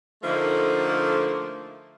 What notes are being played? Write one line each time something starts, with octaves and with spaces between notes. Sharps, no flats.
D3 F3 A3 A#3 D#4